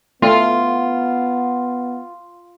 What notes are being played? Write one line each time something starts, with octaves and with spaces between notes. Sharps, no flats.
A3 B3 F4